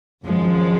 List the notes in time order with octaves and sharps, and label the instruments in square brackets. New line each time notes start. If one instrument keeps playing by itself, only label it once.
[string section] G#1 F#2 F3 G#3